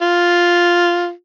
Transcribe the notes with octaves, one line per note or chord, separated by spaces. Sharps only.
F4